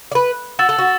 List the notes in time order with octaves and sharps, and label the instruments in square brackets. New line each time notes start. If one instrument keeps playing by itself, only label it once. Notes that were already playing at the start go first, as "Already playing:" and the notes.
[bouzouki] D5
B4
[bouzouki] F#4 [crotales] E6 A6 E7
[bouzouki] A4
F#4